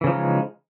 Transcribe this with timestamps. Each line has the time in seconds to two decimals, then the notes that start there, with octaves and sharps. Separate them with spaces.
0.01 E3
0.04 C#3
0.07 F3
0.10 D#4
0.12 G#3